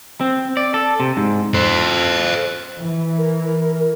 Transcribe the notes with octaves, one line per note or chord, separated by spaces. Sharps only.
C4
D5
A4
C3
G#2
A4 C5
E3
A#4